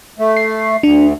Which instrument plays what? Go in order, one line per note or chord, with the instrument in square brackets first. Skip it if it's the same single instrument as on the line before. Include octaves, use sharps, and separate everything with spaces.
[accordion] A3
[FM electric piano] C7
[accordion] D2 [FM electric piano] D4